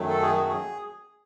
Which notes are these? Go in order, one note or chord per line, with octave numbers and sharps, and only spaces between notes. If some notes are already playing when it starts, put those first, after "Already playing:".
Already playing: F#2 D#3 F#3 A3
A4
G#4
F#4
G#4